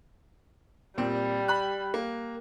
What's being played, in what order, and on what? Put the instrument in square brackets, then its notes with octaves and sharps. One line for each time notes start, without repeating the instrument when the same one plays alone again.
[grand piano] A#2 C4 [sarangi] G3
[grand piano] B5 F#6
A#3